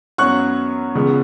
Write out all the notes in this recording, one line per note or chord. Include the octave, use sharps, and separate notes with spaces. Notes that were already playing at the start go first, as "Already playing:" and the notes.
F#2 F#3 B3 C#6 F#6
C#2 C#3 G#3 B3